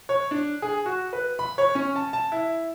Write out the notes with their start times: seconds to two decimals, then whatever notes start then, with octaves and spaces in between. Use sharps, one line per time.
0.09 C#5
0.31 D4
0.62 G#4
0.86 F#4
1.13 B4
1.39 B5
1.58 C#5
1.75 C#4
1.96 A5
2.13 A5
2.32 E4